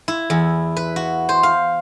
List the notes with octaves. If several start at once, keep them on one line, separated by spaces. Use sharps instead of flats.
E4
E2
B4
F#4
C5
F5